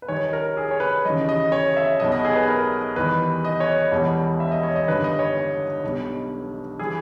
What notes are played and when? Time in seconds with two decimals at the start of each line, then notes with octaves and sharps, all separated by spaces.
0.02 B4
0.08 D#2 D#3 G3 C#5
0.33 A#4
0.57 G#4
0.71 C#5
0.80 B4
1.05 D#2 C#3 E3 G3 D#5
1.29 D#5
1.52 C#5
1.77 E5
2.00 B1 B2 G3 D#5
2.12 D#5
2.25 G#4
2.36 B4
2.48 A#4
2.96 E2 D#3 G3 B4
3.45 D#5
3.60 C#5
3.69 D#5
3.91 E1 E2 B2 G3
4.40 E5
4.52 D#5
4.63 C#5
4.76 D#5
4.88 G1 G2 D#3 G3 B4
5.04 D#5
5.19 C#5
5.84 B1 B2 G3
6.79 E3 G3 G#4